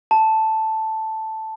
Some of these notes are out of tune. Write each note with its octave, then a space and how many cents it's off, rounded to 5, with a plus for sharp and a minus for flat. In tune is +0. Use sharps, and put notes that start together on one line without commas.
A5 +0